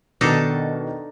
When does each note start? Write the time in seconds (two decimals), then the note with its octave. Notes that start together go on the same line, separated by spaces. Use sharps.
0.21 B2 D#3 D4 D#4 A4